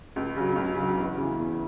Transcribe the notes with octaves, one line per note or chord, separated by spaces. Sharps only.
C#2
C#3 F#3
C#2
C#3 F#3
E2
C#3 E3
E2